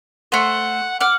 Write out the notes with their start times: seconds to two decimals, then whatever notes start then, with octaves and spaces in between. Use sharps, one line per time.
0.32 A3 C5 F#5
1.01 F#5 D6 F6